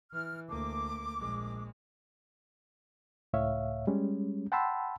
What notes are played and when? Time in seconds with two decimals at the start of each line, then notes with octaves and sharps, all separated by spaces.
0.13 E3 F6
0.48 D2 A#3 D6
1.18 A#1 G#3
3.33 C#2 A2 C#5 E5 F5
3.87 G3 G#3 C#4
4.52 F#5 G5 A5 B5 C6 E6